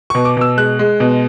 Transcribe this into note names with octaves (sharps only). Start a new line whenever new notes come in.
B2 C#6
D6
B2 E6
G#3 F#6
G#3
B2